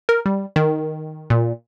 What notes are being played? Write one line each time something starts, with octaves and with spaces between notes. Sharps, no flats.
A#4
G3
D#3
A#2